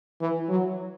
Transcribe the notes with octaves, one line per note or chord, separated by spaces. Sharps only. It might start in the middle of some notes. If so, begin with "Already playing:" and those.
E3
F#3